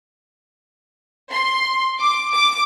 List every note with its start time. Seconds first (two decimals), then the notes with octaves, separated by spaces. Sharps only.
1.32 C6
2.00 D6
2.33 D6